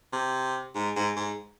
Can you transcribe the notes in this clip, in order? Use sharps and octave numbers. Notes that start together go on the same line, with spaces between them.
C3
G#2
G#2
G#2